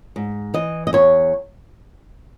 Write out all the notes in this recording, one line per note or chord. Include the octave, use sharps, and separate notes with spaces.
G#2
E3 D#5
D#5
E2 C#5